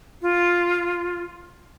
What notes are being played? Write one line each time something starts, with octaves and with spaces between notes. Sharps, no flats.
F4